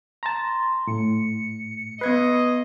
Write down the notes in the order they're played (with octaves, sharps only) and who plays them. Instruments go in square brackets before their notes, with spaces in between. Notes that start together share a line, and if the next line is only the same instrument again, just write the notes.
[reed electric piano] A5 A#5 [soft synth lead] C6
[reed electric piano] A2 [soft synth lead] C#7
[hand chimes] B3 G#6 C7 [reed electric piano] B4 [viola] D#5